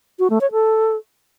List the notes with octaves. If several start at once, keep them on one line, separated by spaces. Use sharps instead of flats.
F#4
A3
C#5
A4